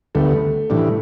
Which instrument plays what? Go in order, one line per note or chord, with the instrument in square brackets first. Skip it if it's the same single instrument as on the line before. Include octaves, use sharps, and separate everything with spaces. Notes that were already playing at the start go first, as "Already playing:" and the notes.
[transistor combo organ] D2 D3 G3 B3 [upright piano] A3
[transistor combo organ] A2 E3 G3 D4